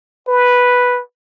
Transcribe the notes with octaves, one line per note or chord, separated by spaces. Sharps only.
B4